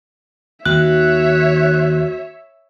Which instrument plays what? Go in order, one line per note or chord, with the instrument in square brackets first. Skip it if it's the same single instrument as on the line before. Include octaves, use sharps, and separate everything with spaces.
[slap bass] D#2 D#3 [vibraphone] F#4 [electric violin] C#5 E5 [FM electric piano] F#6